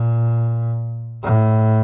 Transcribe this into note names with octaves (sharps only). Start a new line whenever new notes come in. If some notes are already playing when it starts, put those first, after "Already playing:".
Already playing: A#2
A2